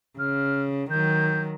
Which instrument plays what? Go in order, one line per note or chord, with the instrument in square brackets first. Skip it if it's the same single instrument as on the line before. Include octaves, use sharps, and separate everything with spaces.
[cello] C#3 [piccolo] F6
[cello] D#3 F#3 [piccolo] G6